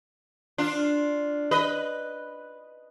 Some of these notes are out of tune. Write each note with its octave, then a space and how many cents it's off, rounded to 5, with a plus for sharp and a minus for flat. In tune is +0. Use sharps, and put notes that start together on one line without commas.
D4 +0 F4 +0
B4 +0 D#5 -5